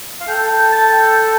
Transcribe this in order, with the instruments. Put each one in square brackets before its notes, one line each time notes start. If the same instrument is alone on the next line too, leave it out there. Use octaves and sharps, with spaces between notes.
[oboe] F5
[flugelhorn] A4 [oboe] G5
[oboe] G5
A5
G5